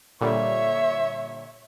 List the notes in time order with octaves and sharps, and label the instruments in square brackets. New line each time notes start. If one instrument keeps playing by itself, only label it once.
[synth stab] A#2 D3 G3 [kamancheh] C#5 E5